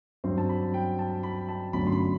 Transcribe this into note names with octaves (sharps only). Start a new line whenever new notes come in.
G2 F#3 C4 C6
A5
B5
G5
A5
B5
A5
G1 F#2 D3 F#3 A3 B5
C6
B5